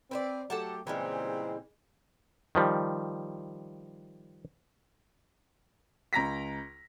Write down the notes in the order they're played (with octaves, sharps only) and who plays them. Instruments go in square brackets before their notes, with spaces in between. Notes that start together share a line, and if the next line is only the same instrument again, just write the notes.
[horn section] C4 [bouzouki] B4 C5 D5
[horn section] F#3 A3 G4 [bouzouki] A4 F#5 A5
[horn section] A#2 C#3 C4 [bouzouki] E3 G3 G#3
[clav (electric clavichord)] D#3 F3 G3
[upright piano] C#2 A#5 A#6 B6